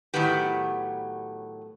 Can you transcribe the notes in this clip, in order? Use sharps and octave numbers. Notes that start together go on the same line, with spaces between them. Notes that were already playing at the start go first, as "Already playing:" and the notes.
A2 D#3 F#3 B3 G4